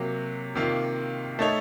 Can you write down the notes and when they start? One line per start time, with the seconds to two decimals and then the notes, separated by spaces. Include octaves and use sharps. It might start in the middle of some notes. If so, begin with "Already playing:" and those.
Already playing: C3 F#3 A#3
0.55 C3 D#3 A#3 F4
1.39 A3 D#4 A4 C#5